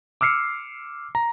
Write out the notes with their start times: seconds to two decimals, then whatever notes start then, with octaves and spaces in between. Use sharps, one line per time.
0.21 D6 E6 F6 C7 C#7
1.15 A#5